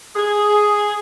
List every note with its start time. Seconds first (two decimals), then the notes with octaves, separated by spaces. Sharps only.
0.16 G#4